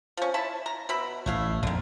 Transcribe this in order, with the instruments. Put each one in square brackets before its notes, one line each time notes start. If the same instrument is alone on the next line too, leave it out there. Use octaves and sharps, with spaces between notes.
[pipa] F3 C#4
E4 A5 B5
A#5
B2 E5 B5
[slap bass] A1 [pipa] A3 E4 F5
[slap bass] A#1 F2 [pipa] D3 D#3